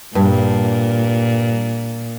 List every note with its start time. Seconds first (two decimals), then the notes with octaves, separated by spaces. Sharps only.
0.15 G2 A#2